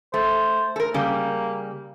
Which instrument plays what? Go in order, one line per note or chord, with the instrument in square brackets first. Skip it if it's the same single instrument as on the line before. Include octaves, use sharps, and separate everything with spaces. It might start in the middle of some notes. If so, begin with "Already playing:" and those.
[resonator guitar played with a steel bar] A3 [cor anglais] C5
[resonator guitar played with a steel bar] A4 A#4
[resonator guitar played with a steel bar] C#3 G3 [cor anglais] A#3